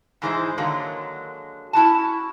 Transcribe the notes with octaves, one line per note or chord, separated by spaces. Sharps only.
G#2 E3 G#3 D#4 E4 C5
D3 D#3 F#3 G#3 A#3
C#4 E4 F#4 A5